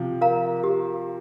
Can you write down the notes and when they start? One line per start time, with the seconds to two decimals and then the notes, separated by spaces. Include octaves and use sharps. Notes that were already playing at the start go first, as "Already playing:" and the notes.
Already playing: C3 F3
0.21 A#4 F5 A#5
0.64 G4